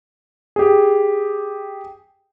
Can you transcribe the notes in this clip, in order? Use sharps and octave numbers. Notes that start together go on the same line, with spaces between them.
G4 G#4